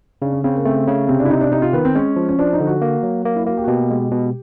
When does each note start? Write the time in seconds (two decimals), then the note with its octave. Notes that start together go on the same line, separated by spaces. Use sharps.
0.22 C#3 D4
0.33 C#4
0.44 C#3 C4
0.55 A#3
0.65 A3 C4
0.88 C#3
1.08 C3 C4
1.19 D4
1.25 E4
1.30 C3 D#4
1.41 D4
1.52 C3 D#4
1.62 F4
1.73 D#3 B3
1.85 C4
1.95 G#3 C#4
2.16 F3
2.29 C#4
2.39 F3 D4
2.53 D#4
2.60 D3
2.67 F#4
2.81 A#3
3.03 F#3
3.25 A#3
3.36 E4
3.46 A#3 F#4
3.57 G4
3.64 F#4
3.68 B2 G4
3.90 G#3
4.11 B2